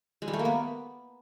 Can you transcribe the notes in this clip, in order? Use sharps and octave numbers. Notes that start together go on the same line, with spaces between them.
G#3
G3
A3
A#3
B3